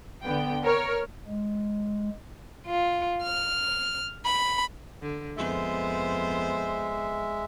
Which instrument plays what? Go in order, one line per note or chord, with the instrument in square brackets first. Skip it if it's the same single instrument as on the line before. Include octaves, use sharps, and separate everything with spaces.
[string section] D3 B3 G5
A#4 C#5 F6
[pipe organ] G#3
[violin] F4
F6
B5
[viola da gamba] D3
[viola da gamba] F2 B3 C5 [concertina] G#3 E5